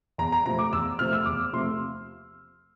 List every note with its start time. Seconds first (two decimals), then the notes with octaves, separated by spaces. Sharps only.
0.18 E2 A#5
0.32 A#5
0.46 C3 F3 A3 C4 A#5
0.59 D6
0.73 E2 E6
0.99 C3 F3 A3 C4 F6
1.13 E6
1.26 E2 D6
1.53 C3 F3 A3 C4 C6